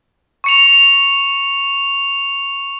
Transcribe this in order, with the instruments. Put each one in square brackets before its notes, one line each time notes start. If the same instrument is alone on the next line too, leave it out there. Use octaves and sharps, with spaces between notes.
[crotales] C#6 C#7 F7